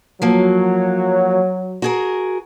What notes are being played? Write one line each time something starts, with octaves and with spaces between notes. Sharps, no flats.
F3 F#3 A#3
F#4 G#4 A#4